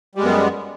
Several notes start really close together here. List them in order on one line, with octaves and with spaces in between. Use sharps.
G3 G#3 F#2 B3